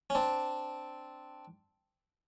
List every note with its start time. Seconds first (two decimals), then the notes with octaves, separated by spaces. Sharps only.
0.10 C#4
0.15 C4 D4